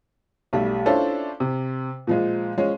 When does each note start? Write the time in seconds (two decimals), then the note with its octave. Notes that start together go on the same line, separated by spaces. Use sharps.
0.53 B1 G3 A3
0.86 C#4 D4 E4 F4 A4 C5
1.40 C3
2.07 A#2 F3 G#3
2.57 F3 G#3 C#4